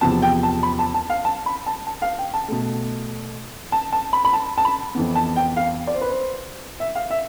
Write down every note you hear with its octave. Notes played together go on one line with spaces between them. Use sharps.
E2 C3 F3 B3 A5
G5
A5
B5
A5
A5
F5
A5
B5
A5
A5
F5
G5
A5
B2 A3
A5
A5
B5
B5
A5
A5
B5
F2 E3 B3
A5
G5
F5
D5
C5
B4
C5
E5
F5
E5